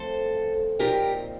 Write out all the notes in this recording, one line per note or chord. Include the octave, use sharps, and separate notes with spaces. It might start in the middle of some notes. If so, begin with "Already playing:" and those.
Already playing: G2 F3 A3 C4 A4 C5
A#2 F3 C4 D#4 G4 A#4